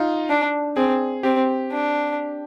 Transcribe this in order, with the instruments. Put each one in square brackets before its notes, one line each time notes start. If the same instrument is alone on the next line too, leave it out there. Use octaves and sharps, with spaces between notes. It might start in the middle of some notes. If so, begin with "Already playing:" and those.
Already playing: [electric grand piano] D#4 F4
[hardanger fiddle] D4
[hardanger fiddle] C4 [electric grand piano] G#4
[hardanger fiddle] C4 [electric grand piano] G4
[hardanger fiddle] D4